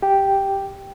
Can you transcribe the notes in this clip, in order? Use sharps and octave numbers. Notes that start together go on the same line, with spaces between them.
G4 G5